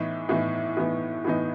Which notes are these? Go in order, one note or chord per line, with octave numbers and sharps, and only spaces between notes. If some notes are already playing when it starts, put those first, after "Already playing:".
Already playing: A2 E3 B3 D#4
A2 E3 B3 D#4
A2 E3 B3 D#4
A2 E3 B3 D#4